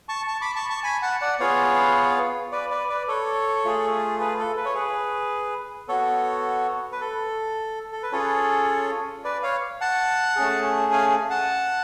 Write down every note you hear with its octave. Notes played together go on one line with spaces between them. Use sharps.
A5 C#6
A5 C#6
B5 D6
A5 C#6
A5 C#6
G#5 B5
F#5 A5
D5 F#5
B3 F4 G#4 C#5 F5
B4 D5
B4 D5
B4 D5
A4 C#5
A3 F4 G#4
G#4 B4
A4
B4
C#5
G#4 B4
B3 F#4 A4 C#5
B4
A4
A4
B4
C#4 F4 G#4 A4 C#5
B4 D5
C#5 F5
F#5 A5
A3 C#4 G#4
F5 G#5
F#5 A5